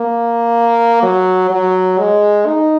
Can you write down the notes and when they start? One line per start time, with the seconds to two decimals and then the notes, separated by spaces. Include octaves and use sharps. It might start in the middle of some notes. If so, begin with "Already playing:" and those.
Already playing: A#3
1.03 F#3
1.51 F#3
1.99 G#3
2.47 D#4